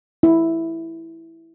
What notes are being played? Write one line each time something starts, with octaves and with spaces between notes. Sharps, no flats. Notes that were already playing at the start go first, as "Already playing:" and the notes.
E4